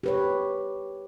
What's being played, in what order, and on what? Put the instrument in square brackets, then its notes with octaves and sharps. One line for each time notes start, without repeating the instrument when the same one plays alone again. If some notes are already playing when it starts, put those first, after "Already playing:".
[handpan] G4 B4 C#5